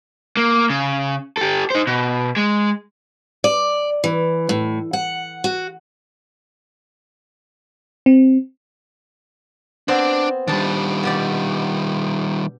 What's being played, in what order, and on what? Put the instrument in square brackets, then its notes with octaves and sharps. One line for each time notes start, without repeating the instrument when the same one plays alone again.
[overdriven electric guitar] A#3
C#3
G4 A4
D#4 C5
B2
G#3
[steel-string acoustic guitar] D5
E3
A2
F#5
F#4
[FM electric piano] C4
[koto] B3 C4 C5 [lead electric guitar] D4
[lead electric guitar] D#3 G3 [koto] D4 A5
[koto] B2 G4 D5